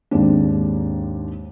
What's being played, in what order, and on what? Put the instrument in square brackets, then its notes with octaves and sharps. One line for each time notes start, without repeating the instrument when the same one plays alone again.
[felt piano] D#2 G#2 C4 D4